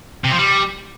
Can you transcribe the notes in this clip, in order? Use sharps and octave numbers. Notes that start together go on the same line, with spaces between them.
C3
F3
G3